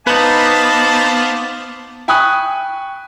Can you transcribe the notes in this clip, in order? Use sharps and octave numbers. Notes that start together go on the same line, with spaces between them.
B3 D#4 B4 C5 F5 A5 D6
G5 G#5 B5 C#6 D#6 F#6